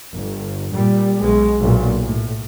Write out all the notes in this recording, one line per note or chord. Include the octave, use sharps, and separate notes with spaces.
G1
A#2 G3
B1 B2 G#3
B1 A#2
A2